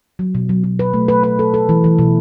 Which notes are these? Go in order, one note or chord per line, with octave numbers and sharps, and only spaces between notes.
F#3
B2
F#3
F#3
B4
A3
B4
B4
A4
A4
E3
E3
B2